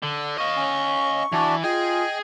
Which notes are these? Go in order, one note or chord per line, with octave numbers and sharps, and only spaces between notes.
D3
D#5 F5 C#6
C#4
E3 D4 F#4 D5
F4 G#4 D#5 G5